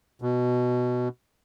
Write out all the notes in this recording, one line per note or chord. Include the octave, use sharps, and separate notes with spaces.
B2